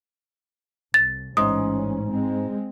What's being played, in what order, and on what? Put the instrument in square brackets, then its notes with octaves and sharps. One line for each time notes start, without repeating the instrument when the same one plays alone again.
[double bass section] C2 [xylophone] A6
[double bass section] A1 C#4 [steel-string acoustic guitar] G#2 [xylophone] D#6
[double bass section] G#3 C4